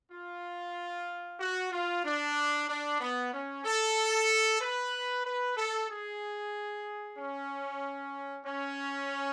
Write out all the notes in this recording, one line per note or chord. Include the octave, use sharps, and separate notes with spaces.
F4
F#4
F4
D4
D4
B3
C#4
A4
B4
B4
A4
G#4
C#4
C#4